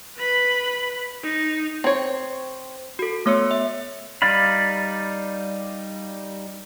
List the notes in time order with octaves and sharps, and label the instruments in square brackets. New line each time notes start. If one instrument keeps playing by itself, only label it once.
[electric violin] B4 B5
D#4
[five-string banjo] C4 C#5
[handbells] F#4 A4
A3 B3 C#5 C6 E6 C#7
E5
[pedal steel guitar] G3 D#4 D5 F5 B5